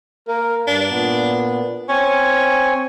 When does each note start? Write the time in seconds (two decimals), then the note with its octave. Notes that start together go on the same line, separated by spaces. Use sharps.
0.28 A#3 A#4
0.67 G2 D4
0.90 A#2 B3
1.89 C4 C#4 G#5 C#6